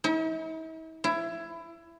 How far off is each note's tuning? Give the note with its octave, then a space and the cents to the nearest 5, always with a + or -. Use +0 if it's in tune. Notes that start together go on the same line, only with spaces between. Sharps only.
E4 -45
E4 +20